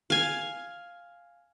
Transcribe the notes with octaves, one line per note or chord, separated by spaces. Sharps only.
F5 G#5